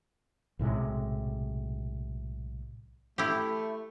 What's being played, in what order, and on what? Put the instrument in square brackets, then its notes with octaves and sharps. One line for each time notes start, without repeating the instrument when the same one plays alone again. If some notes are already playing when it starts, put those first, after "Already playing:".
[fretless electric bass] B1 A2 C3 G#3
[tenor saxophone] A3 [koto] E4 G4